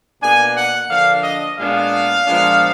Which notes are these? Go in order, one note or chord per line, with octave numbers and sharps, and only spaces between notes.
B2 A#3 D4 G#5
F#5
D3 F3 A#3 D4 F5
D#5
A#2 G#3 B3 D4 F5
A#2 F3 G#3 B3 D4